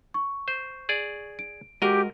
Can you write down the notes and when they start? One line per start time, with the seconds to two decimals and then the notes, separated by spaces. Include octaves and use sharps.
0.14 C#6
0.48 C5
0.89 G#4 D5
1.39 D7
1.82 G#3 F#4 G4 A#4 D#5 F#5